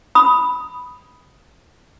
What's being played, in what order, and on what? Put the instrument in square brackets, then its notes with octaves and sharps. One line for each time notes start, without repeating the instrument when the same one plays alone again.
[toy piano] B5 D#6